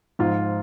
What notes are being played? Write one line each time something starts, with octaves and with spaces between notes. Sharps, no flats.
G#2 F3 F4